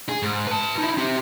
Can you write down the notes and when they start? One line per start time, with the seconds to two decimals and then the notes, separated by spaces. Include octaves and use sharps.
0.09 G#4
0.22 G#2
0.47 B4 A5
0.78 D#4 E4
0.97 C4 G4